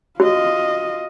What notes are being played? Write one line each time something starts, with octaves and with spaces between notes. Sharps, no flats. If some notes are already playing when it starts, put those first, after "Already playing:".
F4 F#4 D#5